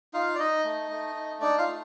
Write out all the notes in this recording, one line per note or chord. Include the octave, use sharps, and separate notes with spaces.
D#4 F4 F5
D5
D#4 D#5
A3
A3
D#4
D4 D#4 D5
F4 F5
A3